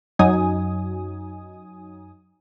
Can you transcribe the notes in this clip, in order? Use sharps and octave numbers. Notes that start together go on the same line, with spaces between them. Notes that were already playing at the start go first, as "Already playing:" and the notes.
F#2 F#3 D#4 G#5 D#6